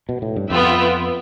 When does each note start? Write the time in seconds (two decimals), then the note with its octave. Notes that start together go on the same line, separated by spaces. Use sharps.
0.09 B2
0.22 A2
0.36 G2
0.50 F2 B3 F4 B4 E5 G5